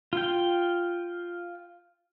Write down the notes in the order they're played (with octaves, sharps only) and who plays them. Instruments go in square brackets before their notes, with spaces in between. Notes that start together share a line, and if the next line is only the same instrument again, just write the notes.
[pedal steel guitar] F4 G5